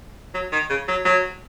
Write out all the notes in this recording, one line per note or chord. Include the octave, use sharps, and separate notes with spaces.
F#3
D#3
C#3
F#3
F#3